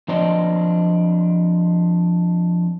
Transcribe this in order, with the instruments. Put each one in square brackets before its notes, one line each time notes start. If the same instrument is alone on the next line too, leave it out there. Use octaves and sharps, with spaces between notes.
[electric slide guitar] F3 C4 D4 C5 D5 D#5